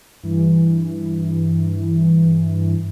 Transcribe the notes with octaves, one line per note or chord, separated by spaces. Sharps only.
G2 E3